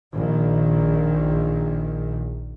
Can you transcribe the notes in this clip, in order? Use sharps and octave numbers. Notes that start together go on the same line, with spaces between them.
A#1 D#3